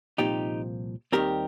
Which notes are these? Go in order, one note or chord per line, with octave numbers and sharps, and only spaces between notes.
C2 A#2 F3 C4 D#4 G4
D#2 D#3 G3 C4 G4 A#4